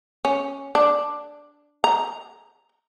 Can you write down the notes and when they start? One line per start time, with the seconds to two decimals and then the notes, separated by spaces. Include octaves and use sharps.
0.25 C#4
0.75 D4
1.84 A#5